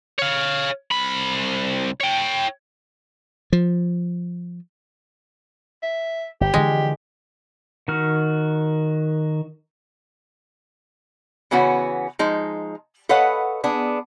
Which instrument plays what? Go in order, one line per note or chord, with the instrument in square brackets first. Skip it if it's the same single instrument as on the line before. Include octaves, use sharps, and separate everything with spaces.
[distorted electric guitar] C#5 F5
C2 B5
C#5 G5
[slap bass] F3
[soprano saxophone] E5
[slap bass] G1 [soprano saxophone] G4
[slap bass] D3 E3 F3 [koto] G#3
[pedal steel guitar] D#3 F#4 F6
[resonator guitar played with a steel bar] C#3 E3 B3 C#4 F#4
F3 G#3 D#4
A4 B4 C#5 D#5 F5 F#5
B3 D4 G#4